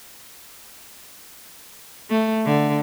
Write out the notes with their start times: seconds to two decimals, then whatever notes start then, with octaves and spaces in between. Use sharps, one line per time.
2.10 A3
2.46 D3